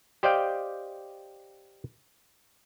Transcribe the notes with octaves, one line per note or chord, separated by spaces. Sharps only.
G4 C5 D5 D#5 F5 G5